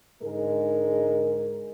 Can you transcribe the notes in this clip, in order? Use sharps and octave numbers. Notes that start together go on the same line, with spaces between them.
G#2 D3 G#3 A#4